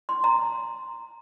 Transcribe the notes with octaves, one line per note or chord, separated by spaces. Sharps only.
C6
A#5